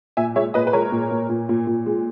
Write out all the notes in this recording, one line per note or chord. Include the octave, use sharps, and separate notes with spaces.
A#2 E5 G#5
G#3 C#5 E5
A#2 B4 D#5
B4
G#3 A#4 C#5
A#2
A#2
A#2
A#2
A#2
G#3